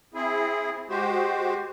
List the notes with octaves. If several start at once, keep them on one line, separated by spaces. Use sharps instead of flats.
C4 E4 G#4
G#3 F#4 G4 C5